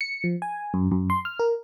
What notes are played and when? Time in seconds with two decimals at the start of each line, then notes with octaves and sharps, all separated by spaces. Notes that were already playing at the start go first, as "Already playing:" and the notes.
0.01 C#7
0.24 F3
0.42 G#5
0.74 F#2
0.92 F#2
1.10 C6
1.25 F6
1.39 A#4